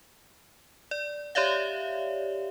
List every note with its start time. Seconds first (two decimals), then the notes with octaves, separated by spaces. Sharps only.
0.91 D5
1.35 G4 C#5 D5 E5 F5